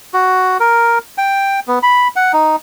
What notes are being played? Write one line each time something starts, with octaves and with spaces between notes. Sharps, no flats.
F#4
A#4
G5
B3
B5
F#5
D#4